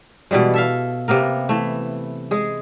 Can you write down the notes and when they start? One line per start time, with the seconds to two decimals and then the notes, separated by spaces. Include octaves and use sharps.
0.31 B2 E3 G3 G#3
0.54 A4 E5 F5
1.08 C3 A#3 B3 A#4
1.49 E3 A3
2.31 G#3 G#4